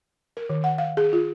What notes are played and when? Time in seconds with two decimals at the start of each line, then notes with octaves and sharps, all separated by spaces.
0.37 A#4
0.50 D#3
0.64 F#5
0.78 F5
0.97 G#4
1.13 F4